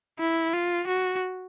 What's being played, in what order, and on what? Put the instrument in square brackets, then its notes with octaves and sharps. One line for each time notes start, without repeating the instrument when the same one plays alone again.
[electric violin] E4
F4
F#4